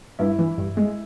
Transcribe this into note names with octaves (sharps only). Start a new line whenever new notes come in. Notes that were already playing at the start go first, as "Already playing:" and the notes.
G2 E4
E3
G2
G#3